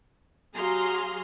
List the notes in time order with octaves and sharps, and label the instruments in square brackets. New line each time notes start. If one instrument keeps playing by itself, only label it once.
[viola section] F#3 G4 G#4 F5 A#5 C6